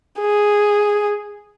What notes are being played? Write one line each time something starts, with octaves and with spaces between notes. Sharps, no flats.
G#4